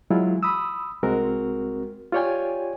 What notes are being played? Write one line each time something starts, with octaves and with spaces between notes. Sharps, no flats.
E3 F#3 G#3 E4 F4
B5 D#6 E6
C2 G#3 C4 F#4 A#4
F4 G4 C#5 D5 G5 G#5